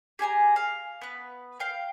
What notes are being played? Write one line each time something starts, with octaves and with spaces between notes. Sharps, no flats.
G4 G#4 G#5 A#5
F5
B3 B4
F5 G5 F6